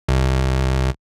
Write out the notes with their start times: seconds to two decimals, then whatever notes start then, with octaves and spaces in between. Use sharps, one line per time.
0.09 C2